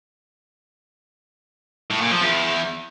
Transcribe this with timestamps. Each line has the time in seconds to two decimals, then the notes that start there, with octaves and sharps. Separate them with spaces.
1.90 A2
2.01 A#2
2.11 F3
2.21 E2